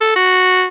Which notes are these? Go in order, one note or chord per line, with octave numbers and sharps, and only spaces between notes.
A4
F#4